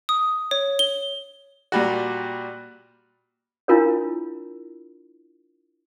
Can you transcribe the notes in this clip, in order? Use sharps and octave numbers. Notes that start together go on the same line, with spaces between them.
D#6
C#5
G7
A#2 G3 F#4
D4 E4 F4 A#4 C#5